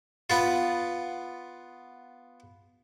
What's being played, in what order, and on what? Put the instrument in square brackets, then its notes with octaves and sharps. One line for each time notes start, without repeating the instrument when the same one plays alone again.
[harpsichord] B3 F4